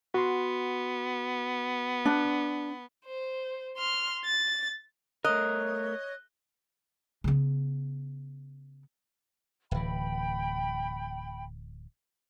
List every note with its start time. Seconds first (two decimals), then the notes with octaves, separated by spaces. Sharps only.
0.14 B3 F#4 C6
2.05 D4
3.05 C5
3.77 C6 F6
4.25 A6
5.24 A3 A#4 C#5 D#5 F#6
7.24 C#3 B3
9.71 D1 E3 G5 B5